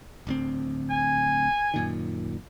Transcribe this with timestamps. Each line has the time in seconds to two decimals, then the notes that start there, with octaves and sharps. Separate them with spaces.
0.27 D1 D2 C4
0.90 G#5
1.74 F#2 A#2 D#3